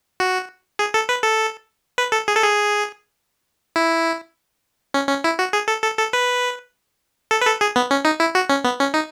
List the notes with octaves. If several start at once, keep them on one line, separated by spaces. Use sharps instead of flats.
F#4
G#4
A4
B4
A4
B4
A4
G#4
A4
G#4
E4
C#4
C#4
E4
F#4
G#4
A4
A4
A4
B4
A4
B4
A4
G#4
B3
C#4
D#4
E4
F#4
C#4
B3
C#4
D#4